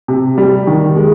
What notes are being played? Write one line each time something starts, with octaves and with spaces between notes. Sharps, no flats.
C3
G3
D#3
G#3